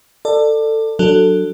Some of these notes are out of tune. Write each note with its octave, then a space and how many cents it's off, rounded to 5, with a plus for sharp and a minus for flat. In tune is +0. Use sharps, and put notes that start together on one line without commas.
A4 +20 D5 +25
F#3 +0 D4 +0 A4 +15